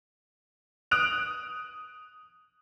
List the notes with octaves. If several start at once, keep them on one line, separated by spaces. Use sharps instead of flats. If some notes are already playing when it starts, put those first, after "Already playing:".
D#6 F#6 D7 F7